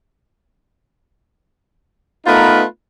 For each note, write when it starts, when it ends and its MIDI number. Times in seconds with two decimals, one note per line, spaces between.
2.27 2.64 57
2.27 2.64 59
2.27 2.64 63
2.27 2.64 65
2.27 2.64 70
2.27 2.64 71